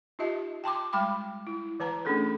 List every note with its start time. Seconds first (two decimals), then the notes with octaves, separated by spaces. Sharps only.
0.19 D#4 F4 G4 D#5 E5 A5
0.64 G5 A5 C6 D6
0.93 G3 G#3 G5 B5 D6
1.47 E4
1.80 E3 B4 A5 A#5
2.05 A3 C#4 D4 G#4 A4